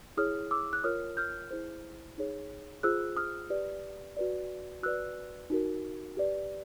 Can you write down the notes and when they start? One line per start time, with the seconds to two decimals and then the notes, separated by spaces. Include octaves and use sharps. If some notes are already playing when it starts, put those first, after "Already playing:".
0.17 E4 G#4 C#5 D#6 F6
0.51 D6 E6
0.73 F#6
0.84 F4 A#4 C#5 D#6 F6
1.17 F6 G6
1.51 E4 G#4 C5
2.18 D#4 G#4 C#5
2.83 F4 G#4 C5 E6 F#6
3.17 D#6 F6
3.50 G4 B4 D5
4.17 F#4 B4 D5
4.83 F#4 B4 D5 E6 F#6
5.50 D#4 F#4 A#4
6.17 G4 B4 D5